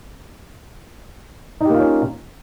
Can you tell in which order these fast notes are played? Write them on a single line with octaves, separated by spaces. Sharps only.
D#4 G4 A#3 F4 C#4